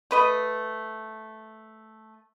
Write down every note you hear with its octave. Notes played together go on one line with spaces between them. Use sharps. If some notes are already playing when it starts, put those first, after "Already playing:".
A3 B4 D#5